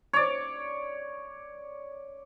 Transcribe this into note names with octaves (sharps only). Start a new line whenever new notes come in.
C#5 D5